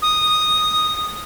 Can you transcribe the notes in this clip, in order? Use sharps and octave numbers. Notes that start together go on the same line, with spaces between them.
D#6